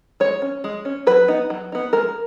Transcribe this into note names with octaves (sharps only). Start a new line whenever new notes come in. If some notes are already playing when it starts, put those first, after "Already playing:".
G#3 C#5
C#4
G#3
C#4
F#3 B4
B3 D#4
F#3
B3 D#4
G#3 A#4